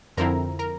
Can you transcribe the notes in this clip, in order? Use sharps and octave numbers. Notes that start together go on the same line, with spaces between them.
F2 D3 F3 C4 E4 A#4 A#5
A#4 A#5